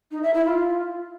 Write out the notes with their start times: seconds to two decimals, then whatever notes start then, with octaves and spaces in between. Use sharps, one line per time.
0.11 D#4
0.23 E5
0.34 E4
0.46 F4